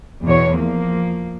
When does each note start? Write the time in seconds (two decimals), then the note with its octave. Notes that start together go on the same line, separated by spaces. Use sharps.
0.24 E2 B2 C#5
0.56 F3 A#3